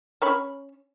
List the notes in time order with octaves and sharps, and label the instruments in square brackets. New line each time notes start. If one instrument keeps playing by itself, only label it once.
[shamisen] C#4 C#5 B5